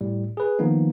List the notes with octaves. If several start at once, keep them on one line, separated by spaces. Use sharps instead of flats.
A2 G3
G#4 B4
D#3 F3 A#3 B3 D#4